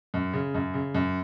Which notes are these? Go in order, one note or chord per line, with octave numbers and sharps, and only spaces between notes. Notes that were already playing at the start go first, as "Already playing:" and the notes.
F#2
C#3
F#2
C#3
F#2